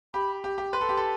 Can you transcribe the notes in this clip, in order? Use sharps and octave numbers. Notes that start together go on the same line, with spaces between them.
G4 B5
G4
G4
B4 C6
A4
G4
A4